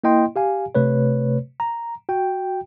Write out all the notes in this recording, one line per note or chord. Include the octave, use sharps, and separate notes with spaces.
A#3 E4 D#5 G5 C6
G4 F5 G#5
C3 A3 B4 C#5
A#5
F#4 G5